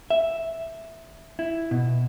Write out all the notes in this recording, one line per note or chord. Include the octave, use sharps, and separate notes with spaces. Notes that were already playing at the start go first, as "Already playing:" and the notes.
E5
E4
B2